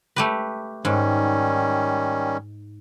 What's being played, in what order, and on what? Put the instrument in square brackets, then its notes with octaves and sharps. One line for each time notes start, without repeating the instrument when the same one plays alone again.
[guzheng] A3 G4 B4
[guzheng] G#2 [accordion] D#3 G3 C#4